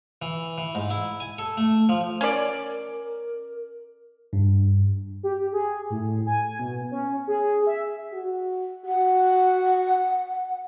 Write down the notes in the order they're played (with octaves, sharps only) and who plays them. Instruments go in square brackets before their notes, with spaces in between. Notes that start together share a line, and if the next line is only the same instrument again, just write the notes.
[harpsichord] E3
E3
G#2
E4
G#5
A4
A3
F3
[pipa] C#4 D5 [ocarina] A#4
[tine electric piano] G2
[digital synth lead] G4
G#4
A2
G#5
B2
C#4
G#4
E5
[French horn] F#4
[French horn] F#4 [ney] F#5